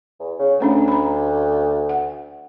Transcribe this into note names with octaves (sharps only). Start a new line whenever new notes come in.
E2
C#3
D2 A3 C#4 D4
A#5 B5
F#5